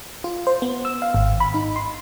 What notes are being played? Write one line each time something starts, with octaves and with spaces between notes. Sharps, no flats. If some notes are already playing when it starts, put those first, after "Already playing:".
F4
C5
B3
E6
F5
G#1
B5
D#4
C6